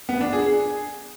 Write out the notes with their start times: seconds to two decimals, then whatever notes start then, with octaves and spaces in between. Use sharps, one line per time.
0.09 B3
0.21 D4
0.33 G#4